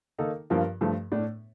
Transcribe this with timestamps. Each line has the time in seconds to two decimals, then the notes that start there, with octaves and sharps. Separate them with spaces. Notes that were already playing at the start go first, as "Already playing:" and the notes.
0.19 D#3 A#3 D#4 A4
0.50 G2 F3 A#3 F4 A#4
0.81 G2 F3 A3
1.12 A2 A3 D4